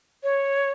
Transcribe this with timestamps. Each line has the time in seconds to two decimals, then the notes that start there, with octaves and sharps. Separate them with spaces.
0.23 C#5